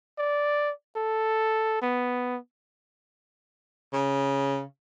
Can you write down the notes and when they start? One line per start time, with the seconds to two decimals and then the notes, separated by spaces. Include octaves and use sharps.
0.19 D5
0.97 A4
1.82 B3
3.93 C#3